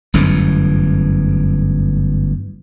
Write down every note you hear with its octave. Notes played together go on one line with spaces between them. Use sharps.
G1 F#2 A2 E3